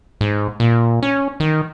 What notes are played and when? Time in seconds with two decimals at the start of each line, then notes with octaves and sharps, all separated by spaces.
0.21 G#2
0.60 A#2
1.02 C#4
1.40 D#3